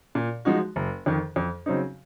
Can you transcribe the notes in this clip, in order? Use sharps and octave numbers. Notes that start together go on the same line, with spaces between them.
A#2
F3 G#3 D#4 F#4
F#1
F2 D#3
F2
C#3 F#3 C4 D#4